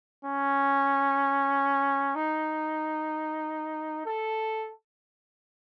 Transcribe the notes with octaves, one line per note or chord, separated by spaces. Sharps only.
C#4
D#4
A4